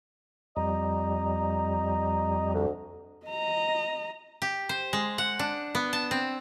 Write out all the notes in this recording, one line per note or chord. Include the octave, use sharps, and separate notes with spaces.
F2 G3 D#5 A#5
D2
D#5 A#5
G4
C5
G#3
F#5
D4
B3
A5
C4